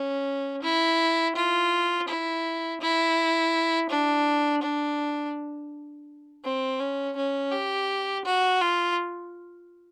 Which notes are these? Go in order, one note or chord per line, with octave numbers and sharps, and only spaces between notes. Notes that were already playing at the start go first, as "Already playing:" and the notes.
Already playing: C#4
E4
F4
E4
E4
D4
D4
C4
C#4
C#4
G4
F#4
F4